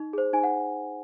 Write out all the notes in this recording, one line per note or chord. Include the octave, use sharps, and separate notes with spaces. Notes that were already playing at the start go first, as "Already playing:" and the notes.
Already playing: D#4
G#4 C5
D#4 G#5
F#5